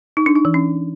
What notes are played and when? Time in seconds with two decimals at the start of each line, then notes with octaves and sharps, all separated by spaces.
0.17 D#4
0.26 D4
0.36 D#4
0.45 E3
0.54 C#4